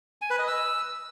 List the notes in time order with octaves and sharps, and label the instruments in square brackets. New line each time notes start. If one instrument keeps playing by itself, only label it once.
[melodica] G#5
B4
D#5
E6